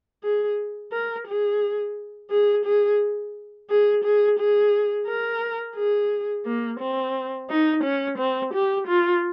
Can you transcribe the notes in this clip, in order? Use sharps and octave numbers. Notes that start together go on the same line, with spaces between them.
G#4
A#4
G#4
G#4
G#4
G#4
G#4
G#4
A#4
G#4
A#3
C4
D#4
C#4
C4
G4
F4